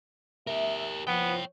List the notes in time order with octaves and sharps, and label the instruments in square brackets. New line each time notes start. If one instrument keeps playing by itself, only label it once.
[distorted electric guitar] G4 A#4 [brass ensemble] E5
[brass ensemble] F3 [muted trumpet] B3 [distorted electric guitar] C#5 G5